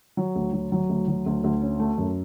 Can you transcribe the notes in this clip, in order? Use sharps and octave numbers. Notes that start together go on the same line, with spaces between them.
F#3
D2
F#3
F#3
D2
F#3
D2
D2
C#4
A3
F#2